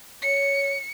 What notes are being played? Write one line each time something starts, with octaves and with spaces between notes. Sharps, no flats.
C#5 C#7